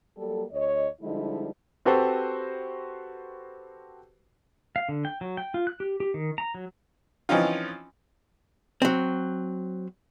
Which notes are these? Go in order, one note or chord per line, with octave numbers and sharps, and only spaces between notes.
F#3 G3 A#3 A4
D2 C#5 D#5
D3 F3 G3 G#3 D#4 E4
C4 F#4 G4 A4 B4 C5
F5
D3
G5
F#3
G5
F4
F#6
G4
G4
D#3
A#5
F#3
E3 F3 C4 C#4 D#4 F4
F#3 C4